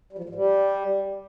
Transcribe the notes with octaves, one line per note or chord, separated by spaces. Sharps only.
G3
F3
A2
G#2
G3